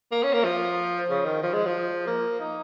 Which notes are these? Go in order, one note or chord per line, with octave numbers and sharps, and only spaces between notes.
A#3
C#4
A#3
F3
C#3
D#3
F3
G#3
F3
A#3
D#4